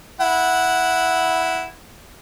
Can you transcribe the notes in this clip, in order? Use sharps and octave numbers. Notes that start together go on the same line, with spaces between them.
E4 F#5